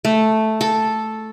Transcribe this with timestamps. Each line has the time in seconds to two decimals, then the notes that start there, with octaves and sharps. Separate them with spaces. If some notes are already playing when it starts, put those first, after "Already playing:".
0.05 A3
0.61 A4